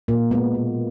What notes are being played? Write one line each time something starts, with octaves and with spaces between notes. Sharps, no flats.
A#2 A#3
G#3 B3
B2